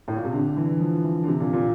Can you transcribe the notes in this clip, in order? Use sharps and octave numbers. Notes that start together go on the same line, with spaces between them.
A2
A#2
C3
D3
E3
F3
E3
D3
C3
A#2
A#2